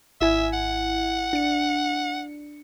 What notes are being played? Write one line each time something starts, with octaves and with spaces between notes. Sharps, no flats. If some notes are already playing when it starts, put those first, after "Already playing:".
G#1 E4 E5 G#5
F#5
D4 C#7